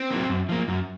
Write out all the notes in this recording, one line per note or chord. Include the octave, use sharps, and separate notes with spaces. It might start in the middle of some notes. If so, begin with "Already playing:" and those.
Already playing: C4
F#3 A#3
F#2
F3 A#3
F#2